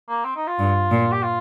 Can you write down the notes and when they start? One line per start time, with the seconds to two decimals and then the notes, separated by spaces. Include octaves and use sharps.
0.09 A#3
0.25 C4
0.36 D#4
0.48 F4
0.58 G2
0.90 A#2
1.12 G4
1.23 F4